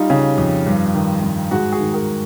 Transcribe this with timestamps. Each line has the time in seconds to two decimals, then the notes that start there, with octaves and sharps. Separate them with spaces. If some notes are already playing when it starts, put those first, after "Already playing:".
Already playing: G3 D#4 F4
0.10 C#3
0.38 F2
0.66 G2
0.95 D#3
1.23 G2
1.51 G#2 F#4 G#4
1.72 F#4 G#4
1.80 D#3
1.94 G#4 A#4